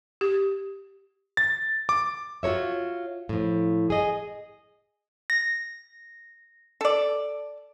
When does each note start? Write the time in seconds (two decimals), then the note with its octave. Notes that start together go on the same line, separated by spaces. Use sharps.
0.21 G4
1.37 A6
1.89 D6
2.43 F4 F#4 A#4 C#5 E5
3.29 A2 F3
3.90 G#4 D#5
5.30 A#6
6.81 A4 D5